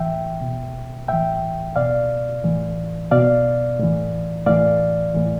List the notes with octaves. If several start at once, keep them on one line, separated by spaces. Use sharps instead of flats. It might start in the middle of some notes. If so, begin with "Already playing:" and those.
Already playing: A2 E3 E5 G5
B2
A2 E3 E5 G5
B2 D5 F5
A2 E3
B2 D5 F5
A2 E3
A2 E3 D5 F5
A2 E3